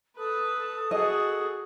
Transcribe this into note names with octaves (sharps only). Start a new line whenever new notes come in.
A4 B4 D#6
F#4 G#4 D#5